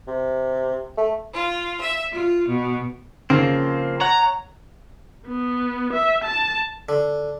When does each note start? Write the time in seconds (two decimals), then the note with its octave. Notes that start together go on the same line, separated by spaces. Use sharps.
0.07 C3
0.97 A3
1.34 F4
1.81 E5
2.13 F4
2.48 B2
3.30 C#3 F3 A#3 C4
4.01 C#5 F#5 A#5
5.27 B3
5.93 E5
6.24 A5
6.89 D3